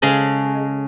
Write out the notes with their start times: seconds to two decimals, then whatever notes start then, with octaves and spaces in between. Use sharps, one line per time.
0.02 C#3 G#3 C#4 A4